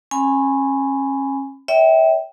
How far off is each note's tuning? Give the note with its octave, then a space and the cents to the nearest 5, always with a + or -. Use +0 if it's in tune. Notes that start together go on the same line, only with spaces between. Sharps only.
C#4 -35 G#5 +0 B5 +15
C#5 +40 E5 -25 G5 -5